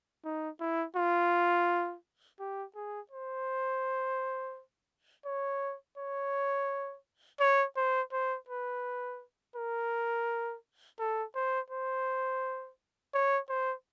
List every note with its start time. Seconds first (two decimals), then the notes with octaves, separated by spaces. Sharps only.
0.25 D#4
0.60 E4
0.96 F4
2.40 G4
2.75 G#4
3.11 C5
5.25 C#5
5.97 C#5
7.40 C#5
7.77 C5
8.13 C5
8.49 B4
9.56 A#4
10.99 A4
11.35 C5
11.71 C5
13.14 C#5
13.49 C5